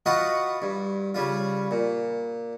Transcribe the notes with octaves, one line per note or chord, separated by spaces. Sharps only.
F4 F#4 B4 D#5 F#5 A5
G2
C#3 G3 F4
A#2